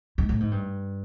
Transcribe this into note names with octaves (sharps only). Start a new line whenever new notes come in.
G#2
A2
G#2
G2